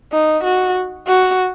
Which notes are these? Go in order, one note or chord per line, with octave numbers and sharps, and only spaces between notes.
D#4
F#4
F#4